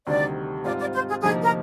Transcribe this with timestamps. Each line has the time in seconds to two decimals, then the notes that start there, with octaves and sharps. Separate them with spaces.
0.07 D2 C3 D#3 G3 D5
0.64 G#2 G3 C4 F4 D5
0.79 D5
0.94 C5
1.09 G#4
1.23 D2 C3 F3 A#3 D#4 G#4
1.43 A#4